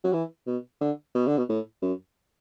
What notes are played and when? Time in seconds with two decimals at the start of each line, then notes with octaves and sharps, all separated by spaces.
0.04 F#3
0.13 E3
0.47 B2
0.81 D3
1.15 B2
1.27 D3
1.38 B2
1.49 A2
1.82 F#2